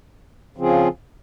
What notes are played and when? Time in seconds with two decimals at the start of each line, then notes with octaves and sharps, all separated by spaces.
0.57 C#3 F3 C4 F4 G#4